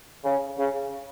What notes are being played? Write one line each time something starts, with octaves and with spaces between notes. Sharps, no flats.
C#3
C#3